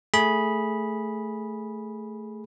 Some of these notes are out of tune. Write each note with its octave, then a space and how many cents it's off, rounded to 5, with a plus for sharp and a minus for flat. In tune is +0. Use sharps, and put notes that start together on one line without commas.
A3 +0 G#4 +0 B5 -15